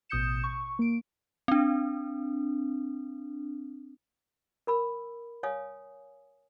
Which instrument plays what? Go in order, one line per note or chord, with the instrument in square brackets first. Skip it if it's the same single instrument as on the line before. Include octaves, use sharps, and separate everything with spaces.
[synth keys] A1 B2 D#6 G6 C#7 E7
C#6
A#3 D7
[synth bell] C4 D4
[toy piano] A#4 B5 E6
C#5 F5 G#5 D#6